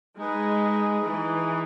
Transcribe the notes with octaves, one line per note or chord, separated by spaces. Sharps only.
G#3 D#4 G#4 B4
E3